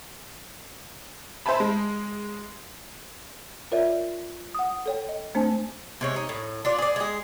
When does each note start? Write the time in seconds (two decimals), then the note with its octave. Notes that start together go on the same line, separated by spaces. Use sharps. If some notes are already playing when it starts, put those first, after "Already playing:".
1.46 C5 E5 G#5 A5 B5
1.60 G#3
3.72 F4 A#4 C#5 D5 E5
4.55 F#5 D#6
4.86 A4 C#5 G5
5.09 D#5
5.35 A3 C4 D4 C5 G#5 A5
6.01 C3 G#3 C#5
6.16 D#4
6.29 A2
6.65 D4 F4 D5
6.78 G#4 D5
6.96 G#3 G#4